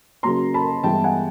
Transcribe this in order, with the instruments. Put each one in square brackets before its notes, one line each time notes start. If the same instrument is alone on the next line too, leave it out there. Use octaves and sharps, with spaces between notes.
[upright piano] C#3 F#3 A#3 A#5 C6
A5 B5
G2 E3 G#3 B3 G5 A5
F#5 G#5